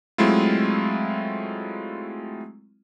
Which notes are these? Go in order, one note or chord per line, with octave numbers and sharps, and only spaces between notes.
F#3 G#3 A3 C4 E4 F4